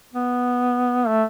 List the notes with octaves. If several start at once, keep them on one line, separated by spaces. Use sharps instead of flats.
B3
A3